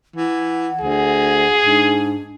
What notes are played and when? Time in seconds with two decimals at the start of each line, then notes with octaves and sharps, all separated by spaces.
0.16 E3 F#5
0.81 D2 G#4
1.65 G#2 D4